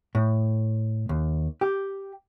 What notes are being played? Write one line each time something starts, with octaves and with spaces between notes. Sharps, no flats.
A2
D#2
G4